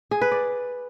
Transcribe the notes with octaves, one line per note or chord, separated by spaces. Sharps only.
G#4
B4
D5